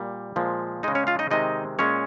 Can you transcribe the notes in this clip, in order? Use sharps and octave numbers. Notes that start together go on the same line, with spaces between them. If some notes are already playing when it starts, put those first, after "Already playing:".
Already playing: A#2 G3
A#2 F3 G#3
C#3 G#3 D#4 D#5
C#4 C#5
F4 F5
D#4 D#5
C3 D#3 G#3 D#4 D#5
A#2 G#3 C#4 C#5